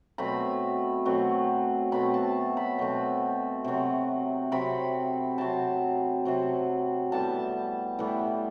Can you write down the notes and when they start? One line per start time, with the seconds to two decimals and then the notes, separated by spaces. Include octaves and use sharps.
0.18 B2 F#3 A3 C4 B5
1.05 B2 F#3 A3 C4
1.92 B2 F#3 A3 C4 B5
2.14 A5
2.57 B5
2.78 B2 F#3 A3 C4
3.64 C3 F#3 C4
4.52 C3 F#3 C4 B5
5.38 C3 F#3 C4 A5
6.25 C3 F#3 C4
7.12 A2 E3 G3 B3 A5
7.99 A2 E3 G3 B3